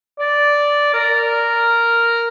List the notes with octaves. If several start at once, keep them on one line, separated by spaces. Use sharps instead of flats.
D5
A#4